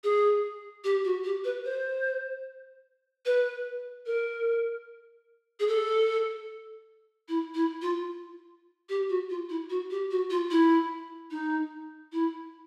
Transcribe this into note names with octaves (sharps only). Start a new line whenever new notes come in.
G#4
G4
F#4
G4
B4
C5
B4
A#4
G#4
A4
E4
E4
F4
G4
F#4
F4
E4
F#4
G4
F#4
F4
E4
D#4
E4